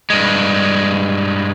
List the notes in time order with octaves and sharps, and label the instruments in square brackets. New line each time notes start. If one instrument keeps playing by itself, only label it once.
[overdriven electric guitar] G2 G#3